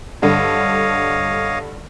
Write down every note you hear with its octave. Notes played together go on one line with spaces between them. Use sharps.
G2 D3 C#5 D#5 F5